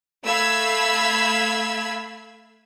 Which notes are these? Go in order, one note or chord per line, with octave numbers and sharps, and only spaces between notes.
A3 F5 B5 E6 G#6